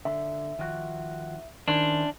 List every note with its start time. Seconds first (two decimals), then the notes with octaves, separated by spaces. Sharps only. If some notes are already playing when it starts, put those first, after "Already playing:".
0.05 D3 E5
0.59 D#3 F3 F#4
1.68 D#3 C#4 D4 E4 C5